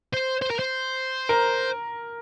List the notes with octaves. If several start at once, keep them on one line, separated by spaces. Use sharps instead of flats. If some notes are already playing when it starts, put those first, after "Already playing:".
C5
C5
A#4
C5
A#4